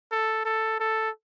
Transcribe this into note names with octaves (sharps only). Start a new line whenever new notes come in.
A4
A4
A4